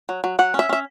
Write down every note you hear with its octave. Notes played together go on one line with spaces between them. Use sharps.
F#3
F#3
F#3 F#5
C#4
E5
C#4 E5